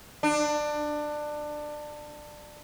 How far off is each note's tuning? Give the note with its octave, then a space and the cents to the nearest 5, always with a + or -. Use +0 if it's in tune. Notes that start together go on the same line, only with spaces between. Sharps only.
D4 +20